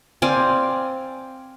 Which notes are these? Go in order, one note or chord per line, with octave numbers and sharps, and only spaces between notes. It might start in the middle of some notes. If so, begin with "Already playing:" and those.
C4 D5 F5 G#5